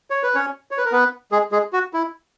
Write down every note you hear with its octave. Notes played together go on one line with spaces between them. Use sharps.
C#5
B4
C#4 C#5
C#5
B4
A#4
B3 B4
G#3 G#4
G#3 G#4
F#4
E4